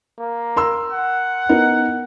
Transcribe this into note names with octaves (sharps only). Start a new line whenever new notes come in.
A#3
A#4 C6 E6
F#5
B3 D#4 A#4